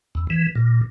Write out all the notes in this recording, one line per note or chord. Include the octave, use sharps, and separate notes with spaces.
E2
E3
A#2